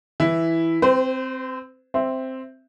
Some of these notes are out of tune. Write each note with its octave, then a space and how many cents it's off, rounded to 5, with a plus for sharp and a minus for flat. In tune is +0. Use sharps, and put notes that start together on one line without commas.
E3 +0 E4 +0
C4 +0 C5 -35
C4 +0 E5 +0